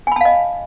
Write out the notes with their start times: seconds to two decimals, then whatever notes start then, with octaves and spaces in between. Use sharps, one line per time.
0.07 G#5
0.12 B5
0.16 A5
0.21 F5
0.25 D#5